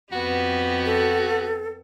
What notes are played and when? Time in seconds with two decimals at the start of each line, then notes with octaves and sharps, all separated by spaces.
0.12 F2 B3 F#4 G4
0.86 A4